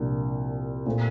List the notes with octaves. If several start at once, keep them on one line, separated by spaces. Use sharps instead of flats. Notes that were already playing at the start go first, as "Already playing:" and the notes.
Already playing: C2 A#2 F3 A#3 D4
A#2 A3 C4